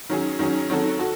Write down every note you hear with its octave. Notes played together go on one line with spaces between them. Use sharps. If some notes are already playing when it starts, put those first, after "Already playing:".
D#3 F#3 C#4 G#4
D#3 F#3 C#4 G#4
D#3 F#3 C4 F#4 A4
F#4 A4